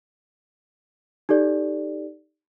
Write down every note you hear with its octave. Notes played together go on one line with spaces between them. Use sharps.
D#4 G4 A4 D5